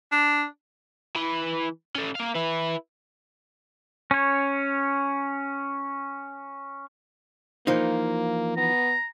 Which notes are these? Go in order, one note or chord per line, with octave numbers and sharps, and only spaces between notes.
D4
E3 B4
C#4 A4
A#3 F5
E4 B4
C#4 C#5
E3 F3 A#3 D#4
B3 A#5